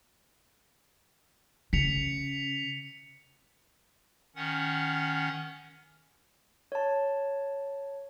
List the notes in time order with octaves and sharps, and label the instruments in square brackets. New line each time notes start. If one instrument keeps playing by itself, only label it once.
[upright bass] C#3 [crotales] B6 C#7 F7
[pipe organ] D#3 C#4 F#5
[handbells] C#5 A5